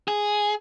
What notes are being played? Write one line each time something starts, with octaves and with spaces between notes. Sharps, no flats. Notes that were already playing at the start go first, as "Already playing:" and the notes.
G#4